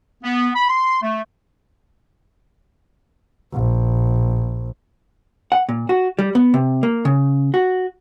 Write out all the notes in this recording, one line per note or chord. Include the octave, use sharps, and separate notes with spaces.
B3
B5
C6
A3
A#1
F#5
A#2
F#4
G3
B3
C3
A#3
C#3
F#4